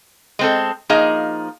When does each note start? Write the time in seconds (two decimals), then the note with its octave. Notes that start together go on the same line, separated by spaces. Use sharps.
0.39 G#3 C4 A4
0.89 F3 A#3 D#4 G#4 D#5 F5